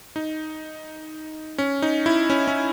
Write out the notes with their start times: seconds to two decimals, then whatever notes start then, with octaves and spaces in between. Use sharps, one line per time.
0.16 D#4
1.58 C#4
1.82 D#4
2.06 E4
2.30 C#4
2.47 C#4